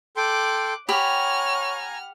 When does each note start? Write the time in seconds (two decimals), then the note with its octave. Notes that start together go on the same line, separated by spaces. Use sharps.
0.16 A4 G5 C6 D6 F#6
0.89 G4 C#5 F#5 G#5 A#5 B5 F6